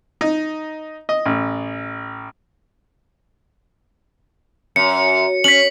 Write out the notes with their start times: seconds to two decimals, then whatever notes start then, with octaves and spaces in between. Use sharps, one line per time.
0.21 D#4
1.09 D#5
1.26 A1
4.76 F#2 C#7
5.44 C#4 B6 F#7